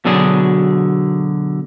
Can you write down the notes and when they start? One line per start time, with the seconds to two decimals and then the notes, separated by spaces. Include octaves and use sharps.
0.05 B2 D3 F#3 D4 G#4